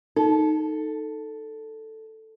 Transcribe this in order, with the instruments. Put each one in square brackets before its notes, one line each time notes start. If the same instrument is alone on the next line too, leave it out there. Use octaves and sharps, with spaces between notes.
[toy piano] D#4 [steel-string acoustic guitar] A4